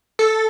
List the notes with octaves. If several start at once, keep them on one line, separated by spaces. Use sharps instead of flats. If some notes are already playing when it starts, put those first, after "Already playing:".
A4